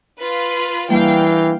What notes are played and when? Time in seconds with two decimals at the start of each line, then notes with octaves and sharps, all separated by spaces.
0.18 F4 B4
0.90 E3 G3 A#3 D4 F5 G5